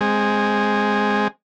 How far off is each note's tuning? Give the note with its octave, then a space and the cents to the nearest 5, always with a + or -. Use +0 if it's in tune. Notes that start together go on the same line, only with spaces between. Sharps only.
G#3 +0 C4 +5